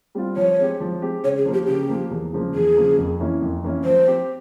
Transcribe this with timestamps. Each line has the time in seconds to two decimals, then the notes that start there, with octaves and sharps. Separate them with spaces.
0.15 G3 C4 F4
0.37 F3 C#5
0.59 G#3 C4 G4
0.80 F3
1.02 G#3 C4 G4
1.23 C#3 C#5
1.38 G#4
1.45 F3 A#3
1.53 G4
1.67 C#3 G4
1.89 F3 A#3
2.11 E2
2.32 C#3 F3 A#3
2.54 E2 G#4
2.76 C#3 F3 A#3
2.98 F2
3.20 E3 A#3 C#4 E4
3.41 F2
3.63 E3 A#3 C#4 E4
3.84 F3 C5
4.07 C4 G4